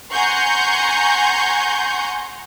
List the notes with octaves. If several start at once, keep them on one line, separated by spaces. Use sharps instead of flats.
F#5 G#5 A#5 C6 C#6 G6